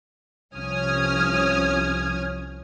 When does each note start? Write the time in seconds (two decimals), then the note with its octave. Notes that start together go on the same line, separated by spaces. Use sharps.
0.55 C2 F3 C#4 D#6 F6 G#6